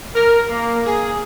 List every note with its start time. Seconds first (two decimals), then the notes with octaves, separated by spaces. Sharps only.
0.15 A#4
0.49 A#3
0.85 G#4